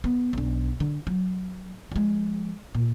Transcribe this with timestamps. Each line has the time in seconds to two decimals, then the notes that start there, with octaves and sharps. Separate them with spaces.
0.04 B3
0.33 B1 D4
0.80 D3
1.07 F#3
1.91 F3 G#3
2.75 A#2